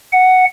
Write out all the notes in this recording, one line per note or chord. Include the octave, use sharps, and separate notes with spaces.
F#5